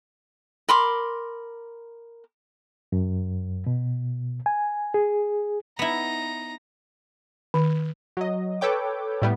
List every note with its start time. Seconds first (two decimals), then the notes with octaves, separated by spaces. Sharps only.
0.69 A#4 B5 C6 D6
2.92 F#2
3.66 B2
4.46 G#5
4.94 G#4
5.79 B3 D#4 E4 A#5
7.54 D#3
8.17 F#3 D#5
8.61 A4 B4 C#5 G5 D6
9.22 A2 G3 B3